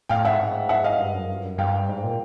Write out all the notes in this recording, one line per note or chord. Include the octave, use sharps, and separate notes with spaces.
A2 F5 G5
G#2 E5 F#5
E5 F#5
D#5 F5
G2
F#2
G2
F#2
G2 F5 G5
G#2
A#2